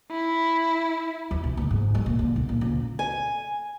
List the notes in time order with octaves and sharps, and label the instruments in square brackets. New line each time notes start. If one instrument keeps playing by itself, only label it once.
[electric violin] E4
[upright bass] E2
B1
D2
G#2
G#3
A#2
D3
B1
A#2
C#2
[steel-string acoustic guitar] G#5